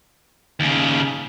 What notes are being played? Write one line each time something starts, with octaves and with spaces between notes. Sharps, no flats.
D#2 C#3